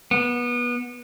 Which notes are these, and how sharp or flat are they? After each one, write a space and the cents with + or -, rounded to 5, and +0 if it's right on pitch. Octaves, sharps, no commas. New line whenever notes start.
B3 -25